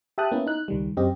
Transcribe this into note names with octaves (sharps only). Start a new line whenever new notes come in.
G4 E5 G5 A5 D#6 F#6
A#3 B3 C#4 E4
D#4 F#6
C#2 D#3 G3
F#2 C4 G4 D#5